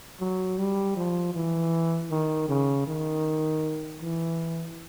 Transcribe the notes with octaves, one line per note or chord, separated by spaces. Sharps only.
F#3
G3
F3
E3
D#3
C#3
D#3
E3